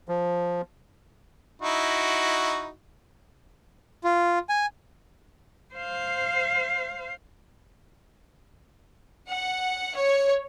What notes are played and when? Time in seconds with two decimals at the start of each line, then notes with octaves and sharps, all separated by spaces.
0.09 F3
1.62 D#4 E4 F#4
4.04 F4
4.49 G#5
5.75 C5 F5
9.29 F#5
9.95 C#5